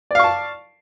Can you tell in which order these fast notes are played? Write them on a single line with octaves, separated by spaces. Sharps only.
D5 F5 C#6 A5